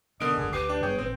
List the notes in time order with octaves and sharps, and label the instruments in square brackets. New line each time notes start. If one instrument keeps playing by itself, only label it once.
[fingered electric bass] B2 B3 C#4 [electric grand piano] D3 D7 [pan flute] A#4 [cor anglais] D#5
[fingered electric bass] F#1 C2 G#2 [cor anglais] G#4
[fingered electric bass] D2 [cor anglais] G4 [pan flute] B4 [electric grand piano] D6 C7
[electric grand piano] D4 [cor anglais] G4
[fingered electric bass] G2 G3 B3 [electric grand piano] G#4 C#5 [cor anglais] G5
[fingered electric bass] G#1 A#2 [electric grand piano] C4